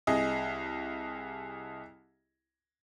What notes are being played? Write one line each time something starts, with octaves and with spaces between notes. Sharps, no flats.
C2 G#4 D#5